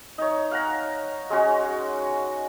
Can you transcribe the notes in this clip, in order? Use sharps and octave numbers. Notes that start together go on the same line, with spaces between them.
D#4 C#5
F5 F#5 A#5
G#3 C#4 F#4